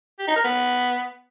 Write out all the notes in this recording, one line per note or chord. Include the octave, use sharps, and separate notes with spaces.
G4
D#4
A#4
B3